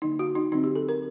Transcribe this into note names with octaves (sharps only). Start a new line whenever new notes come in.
D3 F#3 A#3 D#4
F#4
D#4
D3 F#3 C4 D#4
G4
A4
A#4